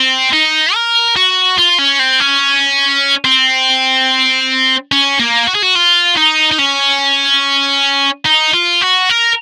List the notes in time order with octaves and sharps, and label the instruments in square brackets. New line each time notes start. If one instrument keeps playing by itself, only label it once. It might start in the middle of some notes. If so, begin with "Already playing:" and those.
Already playing: [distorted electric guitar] C4
D#4
A#4
F#4
F4
C#4
C4
C#4
C4
C#4
A#3
F#4
G#4
F#4
F4
D#4
D#4
C#4
D#4
F4
F#4
A#4